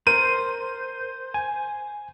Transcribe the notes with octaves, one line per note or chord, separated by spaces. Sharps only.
A#4 C5 D#7
G#5